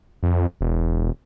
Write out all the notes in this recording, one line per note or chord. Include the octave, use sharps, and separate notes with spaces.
F2
E1